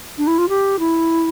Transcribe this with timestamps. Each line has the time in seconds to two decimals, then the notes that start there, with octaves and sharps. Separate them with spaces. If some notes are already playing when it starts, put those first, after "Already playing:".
0.18 D4
0.27 E4
0.38 F4
0.49 G4
0.79 E4